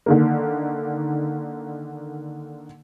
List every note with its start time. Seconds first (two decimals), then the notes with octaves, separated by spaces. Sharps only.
0.06 D3 D#3 A#3